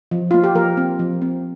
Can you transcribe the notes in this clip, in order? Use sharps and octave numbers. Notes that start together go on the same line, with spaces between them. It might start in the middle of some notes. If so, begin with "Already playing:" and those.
F3
A#3 F4
G4
F3 A#4
C4
F3
C4